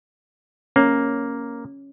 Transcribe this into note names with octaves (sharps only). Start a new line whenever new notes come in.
A#3 C#4